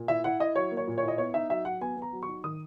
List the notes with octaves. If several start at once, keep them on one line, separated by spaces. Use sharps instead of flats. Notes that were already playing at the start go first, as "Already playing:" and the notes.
Already playing: A#2
E4 E5
E4 F#5
E4 D#5
F#3 C#5
A#3
C#5
A#2
E4 C#5
D#5
B3 C#5
D#4 E5
F#3 E5
F#3 F#5
B3 G#5
B3
A#5
F#3
C#6
D#4
D#3 D#6